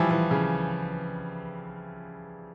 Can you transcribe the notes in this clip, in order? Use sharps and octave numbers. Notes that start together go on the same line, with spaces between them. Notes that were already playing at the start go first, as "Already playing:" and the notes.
Already playing: E3 F3 G3
E3
C#3